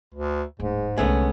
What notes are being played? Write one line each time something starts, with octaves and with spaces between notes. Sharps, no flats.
D2
D1 G#2 G#3
C2 D3 G#3 A3 B3 C#4